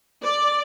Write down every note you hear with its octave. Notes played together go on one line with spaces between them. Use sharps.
D5